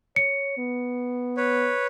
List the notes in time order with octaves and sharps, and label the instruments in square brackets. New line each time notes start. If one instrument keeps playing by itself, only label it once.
[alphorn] C#5 [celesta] C#7
[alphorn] B3
[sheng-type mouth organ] B4 C#5